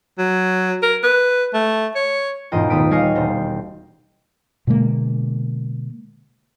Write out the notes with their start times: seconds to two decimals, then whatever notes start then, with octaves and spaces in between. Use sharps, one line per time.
0.18 F#3
0.83 A#4
1.03 B4
1.54 A3
1.95 C#5
2.52 E1 G#2 F4 D#5 G5
2.70 D#1 A3 B3 D#6 B6 D7
2.91 G3 C#5 D#5 F5 G#5 A#6
3.15 E1 G3 C5 A#6
4.67 B2 D3 G#3 A#3